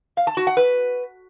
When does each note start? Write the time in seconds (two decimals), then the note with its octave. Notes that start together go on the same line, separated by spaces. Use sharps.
0.17 F5
0.27 A5
0.37 F#4
0.47 F#5
0.57 B4